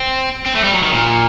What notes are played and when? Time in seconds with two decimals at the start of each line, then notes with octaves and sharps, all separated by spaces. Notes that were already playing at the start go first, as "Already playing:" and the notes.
Already playing: C4
0.46 C4
0.55 A3
0.64 G3
0.73 F#3
0.83 D#3
0.92 A#2